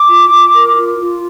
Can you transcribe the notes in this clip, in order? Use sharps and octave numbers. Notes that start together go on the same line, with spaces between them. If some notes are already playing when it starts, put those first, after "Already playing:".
Already playing: D6
F4
F4
A#4
F4
F4